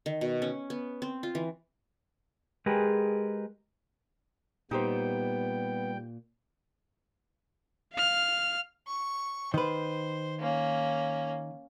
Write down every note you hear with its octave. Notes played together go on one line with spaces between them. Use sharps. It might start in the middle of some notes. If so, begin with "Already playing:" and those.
D#3
B2
C#4
B3
C4
F4
E3
G#3 G4 G#4 A#4 B4
A#2 G3 B3 D#4 G4 C5 G5
F5 F6
C#6
D#3 B4 C5
A#3 C#4